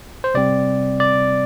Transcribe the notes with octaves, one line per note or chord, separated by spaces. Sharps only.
C5
C3 G3 C4 D5
D5